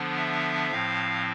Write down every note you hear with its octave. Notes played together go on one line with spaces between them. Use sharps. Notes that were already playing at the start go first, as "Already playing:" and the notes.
Already playing: D3 F3 B3 D4
E5
A2 F3 C4 F5